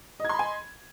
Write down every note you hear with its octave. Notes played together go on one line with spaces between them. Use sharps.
D#5 G#5 B5 C6 G#6